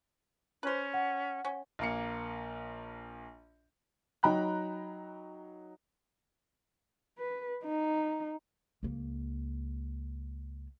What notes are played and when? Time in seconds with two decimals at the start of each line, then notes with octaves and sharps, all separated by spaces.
0.63 C#4 B4 C5
0.94 F#5
1.45 C#4
1.79 A#1 A#3 C#7
4.23 F#3 D#4 G5 A#5 B5 F#6
7.19 B4
7.65 D#4
8.83 C#2 A#3